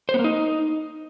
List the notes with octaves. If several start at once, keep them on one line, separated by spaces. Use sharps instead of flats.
C5
B3
A#3
D#4